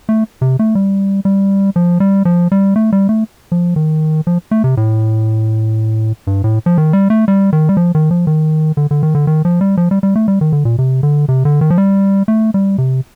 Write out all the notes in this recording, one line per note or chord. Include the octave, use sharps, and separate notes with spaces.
A3
C3
A3
G3
G3
F3
G3
F3
G3
A3
G3
A3
F3
D#3
F3
A3
C3
A2
G2
A2
F3
D#3
G3
A3
G3
D#3
G3
F3
D#3
F3
D#3
D3
D3
D#3
D3
D#3
F3
G3
F3
G3
G3
A3
G3
D#3
D3
A#2
C3
D3
C3
D3
D#3
F3
G3
A3
G3
C3